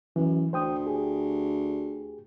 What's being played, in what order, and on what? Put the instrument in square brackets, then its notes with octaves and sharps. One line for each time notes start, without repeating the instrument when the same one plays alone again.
[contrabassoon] F#2 [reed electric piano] E3
[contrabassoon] D2 [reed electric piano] C5 G5 D#6
[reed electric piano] G4 G#4